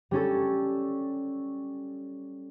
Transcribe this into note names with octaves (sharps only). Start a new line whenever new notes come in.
G3 C#4 A4